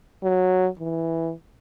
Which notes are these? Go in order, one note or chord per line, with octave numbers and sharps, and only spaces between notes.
F#3
E3